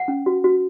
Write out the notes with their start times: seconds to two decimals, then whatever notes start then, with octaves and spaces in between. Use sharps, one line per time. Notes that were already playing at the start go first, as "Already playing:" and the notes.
Already playing: F#5
0.08 C#4
0.26 F#4
0.44 F#4